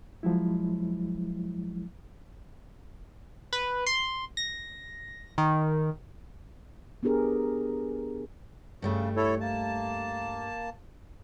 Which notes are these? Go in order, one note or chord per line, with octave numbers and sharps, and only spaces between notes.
F3 F#3 G#3 E4
B4
C6
A#6
D#3
B3 D4 G4 G#4 A#4
G2 C#3 G3 A3
E4 A4 C#5
A#3 A5